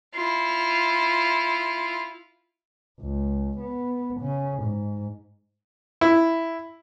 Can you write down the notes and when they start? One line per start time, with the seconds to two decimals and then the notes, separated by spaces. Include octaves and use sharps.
0.15 E4 F4
3.00 C#2
3.59 B3
4.21 C#3
4.63 G#2
6.01 E4